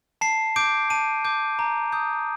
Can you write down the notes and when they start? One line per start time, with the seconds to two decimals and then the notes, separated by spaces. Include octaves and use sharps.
0.21 A5 C7
0.56 D6 G6 D7
0.90 A5 D#7
1.25 D6 G6
1.59 A#5
1.93 D#6 G6